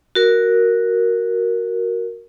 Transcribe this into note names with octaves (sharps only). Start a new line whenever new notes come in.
F#4 A#4